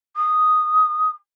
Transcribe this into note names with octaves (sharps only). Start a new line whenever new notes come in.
D#6